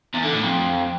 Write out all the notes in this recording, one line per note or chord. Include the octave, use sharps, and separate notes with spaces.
E2
D3
A2
F2